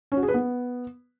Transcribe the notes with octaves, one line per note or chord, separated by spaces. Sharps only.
C#4
F#4
G#4
B4
B3